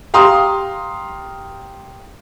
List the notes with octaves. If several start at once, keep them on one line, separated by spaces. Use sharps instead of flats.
G4 F5 A#5 C6 D#6